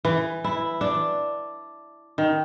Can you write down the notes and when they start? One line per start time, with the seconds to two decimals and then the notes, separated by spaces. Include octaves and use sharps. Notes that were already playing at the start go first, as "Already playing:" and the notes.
0.05 E3
0.44 E4
0.81 D4
2.18 D#3